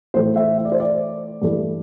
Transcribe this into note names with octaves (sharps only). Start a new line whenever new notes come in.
A2 E3 A3 C5
E5
E5
D5
C5
D5
G2 E3 A3